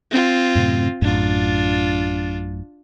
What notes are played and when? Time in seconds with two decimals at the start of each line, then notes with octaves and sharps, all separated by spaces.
0.11 C4 F4
0.55 F#2 A2 C3
1.02 A1 F#2 A2 D4 F4